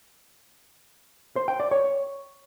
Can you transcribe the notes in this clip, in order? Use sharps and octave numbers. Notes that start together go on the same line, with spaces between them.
C5
G5
D5
C#5